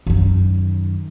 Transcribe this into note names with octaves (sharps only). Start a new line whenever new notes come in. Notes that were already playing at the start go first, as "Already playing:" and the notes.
F#2 D#3